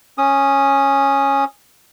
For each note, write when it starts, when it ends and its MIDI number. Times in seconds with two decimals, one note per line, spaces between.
0.18 1.45 61
0.18 1.45 87